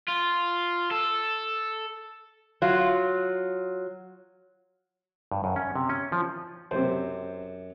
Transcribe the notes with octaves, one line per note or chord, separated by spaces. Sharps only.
F4
A4
F#3 F4
G2
F#2
C#4
C3
C#4
F3
F#2 C3 C5